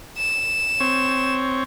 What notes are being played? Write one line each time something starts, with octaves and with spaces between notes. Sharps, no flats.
E7
C4 C#5